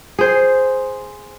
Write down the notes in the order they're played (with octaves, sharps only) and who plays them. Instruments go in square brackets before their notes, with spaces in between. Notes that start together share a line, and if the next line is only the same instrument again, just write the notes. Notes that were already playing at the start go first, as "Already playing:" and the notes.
[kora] G#4 C5